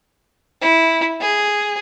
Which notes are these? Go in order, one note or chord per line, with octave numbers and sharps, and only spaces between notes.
E4
G#4